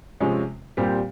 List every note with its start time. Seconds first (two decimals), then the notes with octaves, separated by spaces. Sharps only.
0.20 C3 F3 G#3 C#4
0.77 A#2 G3 C4 G4